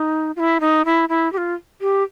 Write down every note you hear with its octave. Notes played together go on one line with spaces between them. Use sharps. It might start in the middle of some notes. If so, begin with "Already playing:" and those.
Already playing: D#4
F4
E4
D#4
E4
E4
G4
F4
G4